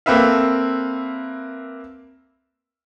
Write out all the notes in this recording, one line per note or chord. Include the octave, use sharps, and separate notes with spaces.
A#3 C4 A4 B4 E5 F5